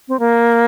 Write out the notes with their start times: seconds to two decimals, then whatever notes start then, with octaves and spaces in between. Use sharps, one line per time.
0.08 C4
0.19 A#3